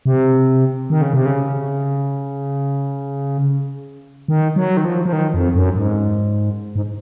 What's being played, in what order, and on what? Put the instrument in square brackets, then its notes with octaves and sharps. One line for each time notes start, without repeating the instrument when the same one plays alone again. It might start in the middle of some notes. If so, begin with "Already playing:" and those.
[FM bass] C3
D#3
C#3
C3
C#3
D#3
F#3
D#3
F3
F3
D#3
F2
F#2
G#2
G#2